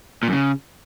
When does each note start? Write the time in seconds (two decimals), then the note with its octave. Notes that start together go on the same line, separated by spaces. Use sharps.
0.23 A#2
0.28 F#2
0.33 C#3